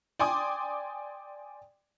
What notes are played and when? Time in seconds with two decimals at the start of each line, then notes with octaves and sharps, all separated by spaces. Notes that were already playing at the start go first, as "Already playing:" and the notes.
0.19 D5 G5 G#5 C6 D6 D#6